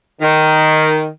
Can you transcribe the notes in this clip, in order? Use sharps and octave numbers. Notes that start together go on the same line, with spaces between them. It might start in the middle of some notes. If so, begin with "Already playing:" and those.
D#3